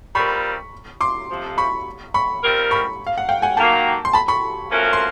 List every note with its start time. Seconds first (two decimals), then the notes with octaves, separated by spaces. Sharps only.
0.15 G3 C4 F4 A#4 B5 C#6
1.01 C6 D6
1.29 F2 C3 F3
1.58 B5 C#6
2.14 B5 C#6
2.43 G3 C4 F4 A#4
2.71 B5 C#6
3.07 F5
3.18 F#5
3.29 F5 G5
3.42 F#5 G#5
3.57 D#3 F#3 A#3 G5 A5
4.05 C6
4.13 A5 B5
4.28 B5 C#6
4.71 F3 A3 C#4 F#4 A#4
4.93 C6